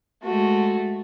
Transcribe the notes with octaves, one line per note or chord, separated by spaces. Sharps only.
G#3 A3 F#4